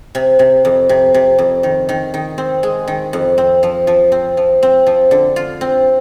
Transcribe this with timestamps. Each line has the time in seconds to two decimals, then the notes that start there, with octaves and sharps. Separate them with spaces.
0.15 C3
0.39 C3
0.65 F2
0.89 C3
1.14 C3
1.38 F2
1.63 D#3
1.89 D#3
2.14 D#3
2.38 C4
2.63 G#3
2.88 D#3
3.13 F2
3.38 C4
3.63 F3
3.87 F3
4.12 C4
4.37 F3
4.63 C4
4.87 F3
5.11 D3
5.36 F4
5.61 C4